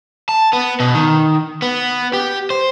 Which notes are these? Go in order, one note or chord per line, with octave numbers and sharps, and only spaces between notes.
A5
B3
B2
D#3
B3
G4
C5